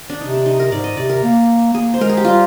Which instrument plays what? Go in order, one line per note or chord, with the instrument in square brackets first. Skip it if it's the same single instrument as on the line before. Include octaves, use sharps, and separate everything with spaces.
[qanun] D4
[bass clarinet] C3 [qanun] D#4
[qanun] D4
D#4
A#4
[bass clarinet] G#2 [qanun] D5
[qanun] D#5
[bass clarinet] C3 [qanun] D5
[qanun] A#4
[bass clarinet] A#3
[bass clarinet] A#3 [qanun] G#4
[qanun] C5
[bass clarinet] G#3 [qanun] A#4
[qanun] G#4
G4
[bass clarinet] G3 [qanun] F4